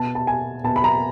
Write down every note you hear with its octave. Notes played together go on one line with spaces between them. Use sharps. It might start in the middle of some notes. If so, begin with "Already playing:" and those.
Already playing: B2 A5
A5
G#5
B2 A5
B5
A#5